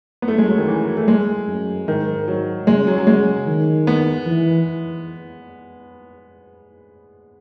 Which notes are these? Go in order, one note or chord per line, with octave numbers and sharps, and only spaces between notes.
B3
F#2 A3
G#3
F#3
D#3
E3
A3
G#3
F#2
G#2 D#3
F#3
C#3 G#3
F#3
F#3
G#3
D#3
B3
E3